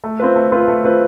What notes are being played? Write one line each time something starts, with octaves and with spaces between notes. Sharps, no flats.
A3
C4 F4 B4
A3
C4 F4 B4
A3
C4 F4 B4